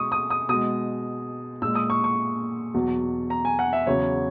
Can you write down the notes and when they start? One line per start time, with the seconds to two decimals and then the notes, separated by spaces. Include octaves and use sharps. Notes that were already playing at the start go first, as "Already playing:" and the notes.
Already playing: B2 G#3 C#6 D#6
0.12 D#6
0.30 D#6
0.49 B2 G#3 D#6
1.62 A#2 G#3 E6
1.75 D#6
1.90 C#6
2.04 C#6
2.74 E2 B2 F#3
3.30 A#5
3.45 G#5
3.59 F#5
3.73 E5
3.87 E2 C#3 F#3 C#5